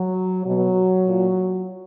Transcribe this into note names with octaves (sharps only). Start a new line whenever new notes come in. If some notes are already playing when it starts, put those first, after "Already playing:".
Already playing: F#3
B2 F#3
A#2